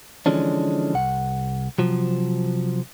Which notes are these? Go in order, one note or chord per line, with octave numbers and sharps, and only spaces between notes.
D3 E3 F3 G#3 C#4 D4
C2 F#5
C3 F3 F#3